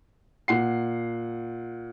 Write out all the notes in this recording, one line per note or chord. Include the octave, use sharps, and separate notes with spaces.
A#2 F#5 C7